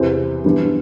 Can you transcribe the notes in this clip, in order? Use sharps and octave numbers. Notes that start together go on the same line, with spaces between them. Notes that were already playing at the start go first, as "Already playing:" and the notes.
Already playing: E2 C3 E3 C5
G2 E3 B3 D4